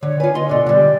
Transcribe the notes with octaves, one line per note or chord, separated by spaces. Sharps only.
D3 C#5
F4 B4 G#5
F4 D#5 C6
B2 D3 D5
D3 G3 D5